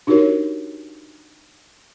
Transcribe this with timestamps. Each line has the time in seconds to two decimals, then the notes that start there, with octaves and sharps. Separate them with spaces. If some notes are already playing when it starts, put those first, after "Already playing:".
0.07 D4 D#4 F#4 G4 A#4 C#5